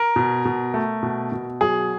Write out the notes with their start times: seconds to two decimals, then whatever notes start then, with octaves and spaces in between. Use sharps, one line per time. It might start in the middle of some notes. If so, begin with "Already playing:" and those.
Already playing: A#4
0.16 B2
0.45 B2
0.74 A3
1.03 B2
1.32 B2
1.61 F#3 G#4